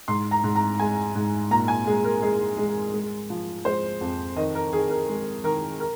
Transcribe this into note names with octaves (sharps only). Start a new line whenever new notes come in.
G#2 C6
A#5
G#2
A#5
G#3 G#5
G#2
A#2 A#5
G#5
G#3 G#4
A#4
G#3 G#4
G#3
G#3
F3
G#3 C5
F2
D#3 D#5
A#4
D#3 G#4
A#4
G#3
D#3 A#4
A#4